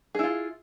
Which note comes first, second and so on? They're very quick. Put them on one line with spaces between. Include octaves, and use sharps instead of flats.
G#4 E4 F4